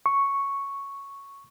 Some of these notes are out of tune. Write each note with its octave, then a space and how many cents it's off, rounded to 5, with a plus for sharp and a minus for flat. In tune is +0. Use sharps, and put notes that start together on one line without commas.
C#6 +0